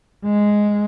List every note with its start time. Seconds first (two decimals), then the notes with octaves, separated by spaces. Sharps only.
0.24 G#3